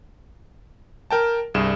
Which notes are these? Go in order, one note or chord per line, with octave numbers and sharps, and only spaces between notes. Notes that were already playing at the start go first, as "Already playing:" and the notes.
A#4 G5 A5
C2 G2 G#4 E7